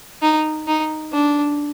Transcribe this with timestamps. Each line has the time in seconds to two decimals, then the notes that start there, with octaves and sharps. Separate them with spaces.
0.22 D#4
0.68 D#4
1.13 D4